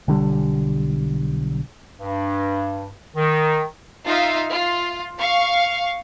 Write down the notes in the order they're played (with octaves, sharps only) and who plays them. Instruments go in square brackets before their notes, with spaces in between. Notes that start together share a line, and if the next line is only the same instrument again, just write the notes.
[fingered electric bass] B1 D3 G3
[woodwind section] G2
D#3
[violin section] D#4 F4 E5 F5
F4
F5 C#6